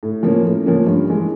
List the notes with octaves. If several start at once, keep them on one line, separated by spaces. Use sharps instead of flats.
A2
F3 A#3 C#4
A2
F3 A#3 C#4
G2
E3 G#3